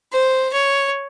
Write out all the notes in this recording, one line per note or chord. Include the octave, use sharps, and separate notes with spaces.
C5
C#5